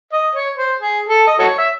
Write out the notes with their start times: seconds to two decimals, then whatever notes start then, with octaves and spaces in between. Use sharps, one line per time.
0.13 D#5
0.35 C#5
0.57 C5
0.79 G#4
1.09 A4
1.27 D#5
1.39 F#4 A4 C#5
1.59 E5